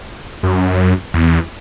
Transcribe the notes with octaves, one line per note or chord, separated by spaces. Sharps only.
F#2
E2